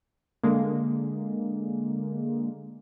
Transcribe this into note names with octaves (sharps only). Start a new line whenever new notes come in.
D3 G#3 A#3